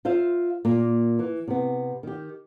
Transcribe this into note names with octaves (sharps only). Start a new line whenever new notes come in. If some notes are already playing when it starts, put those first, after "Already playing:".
F4 C5 E5 F5
A#2 A#3
E3
C3 B3
D#3 G4